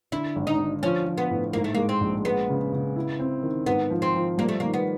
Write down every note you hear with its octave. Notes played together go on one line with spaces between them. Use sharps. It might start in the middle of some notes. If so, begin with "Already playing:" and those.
D3 E4
G#1
D#4
D3
F3 C#4
F3
B3
A2
G#2 A#3
A3
G#3 A#3
C4
A#1
G#3 B3
C#3
C#3
E4
C4
D#3
G#2 B3
F3
C4
F3
G3 A#3
A3
D#3 A#3
B3